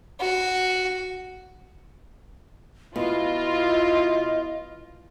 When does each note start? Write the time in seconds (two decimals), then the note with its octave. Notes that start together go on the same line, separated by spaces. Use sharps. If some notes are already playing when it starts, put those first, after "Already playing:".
0.20 F#4
2.96 B2 E4 F4 D#5